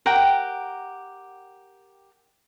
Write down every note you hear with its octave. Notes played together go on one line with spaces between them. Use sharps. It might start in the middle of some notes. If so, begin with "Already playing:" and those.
G4 A#4 F#5 G5